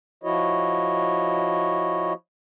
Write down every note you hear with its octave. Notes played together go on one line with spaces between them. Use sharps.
F3 E4 F#4 C#5 D#5